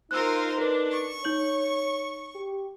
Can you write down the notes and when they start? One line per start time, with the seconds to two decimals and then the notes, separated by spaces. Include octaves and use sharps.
0.11 D#4 F4 A#4 C5 E6 F#6
0.58 D4 A#4 B4
0.91 C#6
1.24 D#4 C#5 G6 F#7
2.35 G4